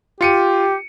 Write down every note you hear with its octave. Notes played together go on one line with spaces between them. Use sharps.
F4 G4 C#7 D#7